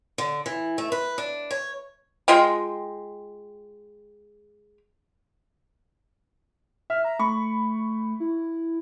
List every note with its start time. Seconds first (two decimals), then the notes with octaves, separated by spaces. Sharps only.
0.18 D3
0.46 E3
0.78 A3
0.92 B4
1.18 D4
1.51 C#5
2.28 G#3 F4 D#5 G5
6.90 E5 F6
7.05 A#5
7.19 A3 B5 C#6
8.20 E4